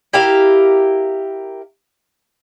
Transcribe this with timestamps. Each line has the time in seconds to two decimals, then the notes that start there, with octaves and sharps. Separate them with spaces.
0.13 E4 G4 A#4 F5